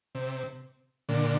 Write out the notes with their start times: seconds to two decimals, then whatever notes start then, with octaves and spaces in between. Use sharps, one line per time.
0.15 C3
1.09 A#2 D3